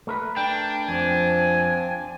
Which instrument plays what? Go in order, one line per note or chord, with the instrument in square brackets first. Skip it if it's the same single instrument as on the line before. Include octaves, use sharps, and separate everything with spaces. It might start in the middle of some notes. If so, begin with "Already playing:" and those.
[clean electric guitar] A3 A#4 B4
[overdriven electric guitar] D4 [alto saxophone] G5
[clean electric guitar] F2 [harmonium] F3 C4 [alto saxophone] G#5